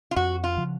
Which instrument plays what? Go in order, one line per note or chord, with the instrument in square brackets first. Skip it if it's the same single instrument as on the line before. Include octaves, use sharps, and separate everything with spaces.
[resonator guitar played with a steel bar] F4
[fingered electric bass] F2 [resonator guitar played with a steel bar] F#4
[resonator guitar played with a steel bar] F4
[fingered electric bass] C#3 F3